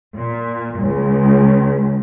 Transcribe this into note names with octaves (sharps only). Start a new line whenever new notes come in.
A#2
C#2